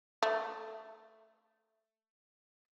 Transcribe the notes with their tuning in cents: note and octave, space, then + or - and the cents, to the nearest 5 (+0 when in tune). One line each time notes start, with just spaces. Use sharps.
A3 +5